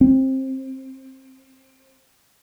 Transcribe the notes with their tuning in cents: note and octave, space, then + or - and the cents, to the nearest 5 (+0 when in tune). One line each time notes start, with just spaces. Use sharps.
C4 +20